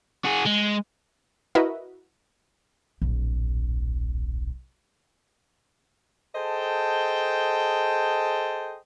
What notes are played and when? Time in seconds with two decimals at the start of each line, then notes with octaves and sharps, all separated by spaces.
0.24 F#4 G#4
0.46 G#3
1.55 E4 F#4 A#4 B4 D#5 E5
3.02 D1 A#1
6.34 G#4 A4 C5 D#5 G5 A5